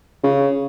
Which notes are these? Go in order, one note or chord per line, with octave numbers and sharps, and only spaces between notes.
C#3